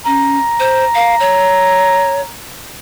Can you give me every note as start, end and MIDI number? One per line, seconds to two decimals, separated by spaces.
0.06 0.38 61
0.06 2.32 82
0.60 0.84 72
0.95 1.16 77
1.20 2.21 73